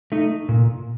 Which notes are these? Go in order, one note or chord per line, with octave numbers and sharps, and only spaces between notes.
A3 D#4
A#2